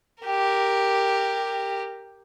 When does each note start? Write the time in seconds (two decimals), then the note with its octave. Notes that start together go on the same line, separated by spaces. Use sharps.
0.24 G4 A#4